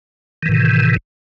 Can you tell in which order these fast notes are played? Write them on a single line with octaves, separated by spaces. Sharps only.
D#3 E3 A2 C3